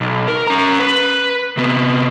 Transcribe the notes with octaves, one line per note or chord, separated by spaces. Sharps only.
B1
A#4
C#4 A#5
B4
C3 B3